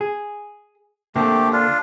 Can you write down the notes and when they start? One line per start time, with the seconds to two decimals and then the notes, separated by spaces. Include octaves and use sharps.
0.01 G#4
1.16 D3 A3 A#3 C4 G4
1.53 D4 F4